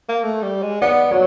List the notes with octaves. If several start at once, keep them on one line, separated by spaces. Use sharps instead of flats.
A#3
A3
G3
G#3
B3 D5
F#3 C#5